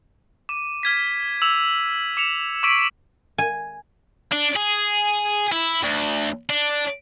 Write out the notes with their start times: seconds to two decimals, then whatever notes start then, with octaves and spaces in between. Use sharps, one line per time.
0.49 D6 D#7
0.83 F6 G#6 B6
1.42 D6 E6 F7
2.17 D6 C#7 E7 F7
2.63 C#6 D6 E6 B6 D7 F#7
3.38 G#5
4.32 D4
4.56 G#4
5.52 E4
5.83 D2
6.50 D4